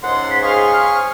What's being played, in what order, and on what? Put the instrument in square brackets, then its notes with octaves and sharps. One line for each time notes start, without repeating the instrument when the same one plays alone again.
[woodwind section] C#2 G#2 C6 [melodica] F#5
[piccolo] B6
[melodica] G#4 C#6 [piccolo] F5
[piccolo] F6